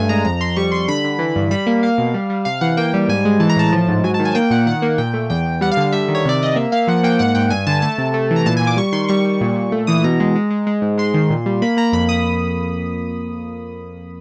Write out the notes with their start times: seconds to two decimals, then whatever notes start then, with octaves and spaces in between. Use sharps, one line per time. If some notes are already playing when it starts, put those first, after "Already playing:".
Already playing: G2 A3 G#5
0.09 G#3 A#5
0.25 F2 A#5
0.40 F2 C6
0.56 G3 C#6
0.72 G3 C6
0.88 D3 B5
1.04 D3
1.19 E3
1.36 G2
1.51 G3 B5
1.67 A#3
1.83 A#3 F5
1.98 B2
2.14 G3
2.30 G3
2.45 C3 F5
2.61 E3 F#5
2.77 A#3 G5
2.94 G3
3.08 G#2 G#5
3.25 G#3
3.40 E3 A5
3.49 A#5
3.56 A2 A5
3.73 F3
3.88 G#2
4.04 F#3 G#5
4.14 A5
4.20 D#3
4.25 G#5
4.35 A#3 G5
4.50 A#2 F#5
4.66 D#3 F#5
4.82 A#3
4.98 A#2 G5
5.14 A3
5.30 E2 G5
5.46 E2
5.61 G3 F#5
5.71 F5
5.77 D3
5.83 F5
5.93 G3 E5
6.08 D#3
6.15 C#5
6.25 C3 D5
6.40 C3 D#5
6.56 A#3 E5
6.72 A#3 F5
6.87 F3 F#5
7.03 A#3 G5
7.19 G#2 F#5
7.35 G#2 G5
7.50 G2 G#5
7.67 D3 A5
7.82 A3 A5
7.98 C3
8.14 A3
8.31 E3
8.36 A#5
8.46 A#2 A5
8.57 G#5
8.61 A#2
8.67 D6
8.77 G3 C#6
8.93 D#3 C6
9.08 G3 C#6
9.25 G3
9.41 A#2
9.56 A#2
9.72 A3
9.87 E3 D#6
10.04 B2 A#5
10.20 G#3
10.35 G#3
10.51 G#3
10.67 G#3
10.82 G#2
10.98 G#3 C6
11.14 D#3
11.30 A#2
11.46 G3
11.62 A#3 B5
11.77 A#3 A#5
11.92 F2 B5
12.09 D#6